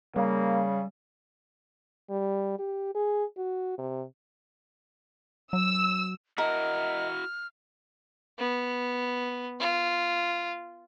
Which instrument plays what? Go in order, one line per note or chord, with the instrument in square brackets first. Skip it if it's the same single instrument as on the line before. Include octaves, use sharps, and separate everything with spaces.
[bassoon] C#3 [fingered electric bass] G3 [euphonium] A#3
[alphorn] G3
G4
G#4
F#4
C3
[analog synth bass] F#3 [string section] E6
[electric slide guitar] E4 F#4 [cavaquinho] A#4 [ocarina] D#5 [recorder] F6
[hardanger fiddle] B3
F4